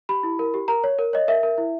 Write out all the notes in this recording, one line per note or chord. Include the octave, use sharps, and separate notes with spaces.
G4 B5
E4
A#4
G4
A#4 A#5
C#5
A#4
C#5 D#5
A#4 E5
A#4
E4